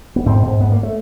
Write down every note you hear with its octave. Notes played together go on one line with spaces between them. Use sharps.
B3
G#2 C4
G#2
G#2 B3
A#3
A3